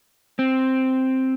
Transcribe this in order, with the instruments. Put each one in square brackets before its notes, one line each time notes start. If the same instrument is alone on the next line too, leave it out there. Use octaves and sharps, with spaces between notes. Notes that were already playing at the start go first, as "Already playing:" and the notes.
[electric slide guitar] C4